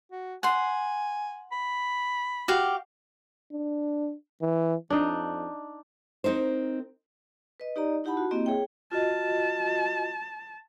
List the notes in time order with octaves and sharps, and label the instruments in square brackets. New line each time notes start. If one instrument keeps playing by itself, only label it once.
[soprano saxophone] F#4
[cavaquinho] F#5 C6 [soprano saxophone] G#5
[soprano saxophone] B5
[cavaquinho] F#4 G4 F5
[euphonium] D4
E3
[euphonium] F2 [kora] D4 D#4
[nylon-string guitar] C4 D#4 A#4 C5
[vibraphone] B4 D#5
D#4 G4 D5 D#5 A#5
D#4 E4 G4 F#5 A5 B5
F#4
A#3 C4 E4 G4 D#5
G#4 C#5 E5 G5
[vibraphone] F4 F#4 D#5 [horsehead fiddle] A5